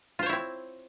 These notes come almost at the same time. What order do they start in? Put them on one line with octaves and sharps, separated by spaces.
F4 C5 C#5 E4 C4